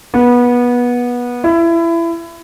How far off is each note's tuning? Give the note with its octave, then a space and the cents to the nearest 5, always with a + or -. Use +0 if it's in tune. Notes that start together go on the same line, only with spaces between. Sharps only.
B3 -20
E4 +25